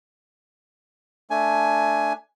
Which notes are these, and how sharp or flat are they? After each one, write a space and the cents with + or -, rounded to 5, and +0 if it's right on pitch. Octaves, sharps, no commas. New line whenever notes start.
A3 +5 D4 +0 G#5 +10